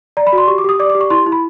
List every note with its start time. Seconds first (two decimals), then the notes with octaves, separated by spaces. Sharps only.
0.17 D5 A#5
0.27 B5
0.33 F#4
0.38 C6
0.47 G4 C#6
0.58 D6
0.64 G4 D#6
0.79 D5 D6
0.90 D6
0.95 G4
1.01 C#6
1.10 E4 C6
1.26 E4
1.32 B5